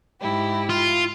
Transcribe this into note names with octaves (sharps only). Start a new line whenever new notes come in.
G#2 E4 G4
F4